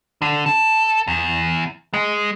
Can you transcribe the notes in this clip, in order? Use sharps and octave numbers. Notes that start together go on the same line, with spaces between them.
D3
A4
E2
G#3